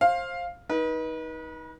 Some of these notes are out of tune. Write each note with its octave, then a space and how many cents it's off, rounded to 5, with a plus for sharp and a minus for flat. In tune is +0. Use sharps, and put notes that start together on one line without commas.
C5 +25 F5 +5
D#4 +20 B4 -35